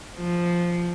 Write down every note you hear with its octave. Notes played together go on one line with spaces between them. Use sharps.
F3